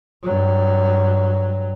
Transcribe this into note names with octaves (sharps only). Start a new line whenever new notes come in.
G2 F#3